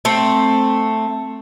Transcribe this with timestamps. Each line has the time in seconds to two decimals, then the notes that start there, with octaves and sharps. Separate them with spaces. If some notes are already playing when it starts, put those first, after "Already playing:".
0.05 A3 C4